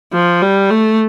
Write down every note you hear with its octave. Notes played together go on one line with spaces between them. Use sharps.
F3
G3
A3